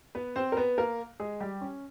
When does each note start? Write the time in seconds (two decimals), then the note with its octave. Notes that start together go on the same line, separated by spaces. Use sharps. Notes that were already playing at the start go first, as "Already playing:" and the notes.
0.15 B3 B4
0.36 C4 C5
0.52 A#4
0.57 B3 B4
0.78 A#3 A#4
1.20 G#3 G#4
1.40 G3 G4
1.61 C#4